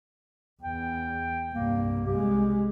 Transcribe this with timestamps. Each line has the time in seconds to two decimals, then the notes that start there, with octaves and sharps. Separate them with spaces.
0.63 E2 G5
1.53 C2 G2 A#3
2.06 C2 G#3 G4